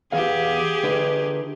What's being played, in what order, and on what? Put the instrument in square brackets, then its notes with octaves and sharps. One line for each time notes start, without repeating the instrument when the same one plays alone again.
[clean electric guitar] E2 B3 F5 [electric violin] G4 G#4
[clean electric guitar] D3 B4